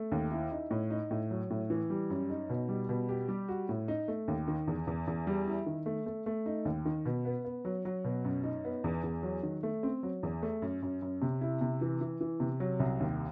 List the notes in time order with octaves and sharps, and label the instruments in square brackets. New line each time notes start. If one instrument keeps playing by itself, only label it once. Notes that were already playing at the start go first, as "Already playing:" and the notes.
Already playing: [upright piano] A3
D#2
E4
D#4
A2
D#4
A2
F#3
A2
E3
G3
F#2
D#4
B2
G3
B2
G4
G3
F#4
A2
D#4
A3
D#2
D#3
E2
E2
E2
G3
E4
D#3
A3
A3
A3
D#4
D#2
D#3
B2
B3
B3
F#3
F#3
B2
F#2
D#4
B3
E2
E2
F#3
D#3
A3
C4
F#3
E2
A3
F#2
F#2
F#2
C3
E4
C3
E3
E3
E3
C3
F#3
C2
D#2